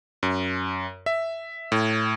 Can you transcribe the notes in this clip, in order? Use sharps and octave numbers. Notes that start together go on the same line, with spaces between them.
F#2
E5
A2